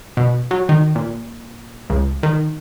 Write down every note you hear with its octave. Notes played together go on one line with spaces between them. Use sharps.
B2
F#3
D#3
A#2
C#2
D#3